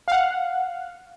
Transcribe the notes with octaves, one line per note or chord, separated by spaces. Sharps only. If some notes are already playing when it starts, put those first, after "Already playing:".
F5 F#5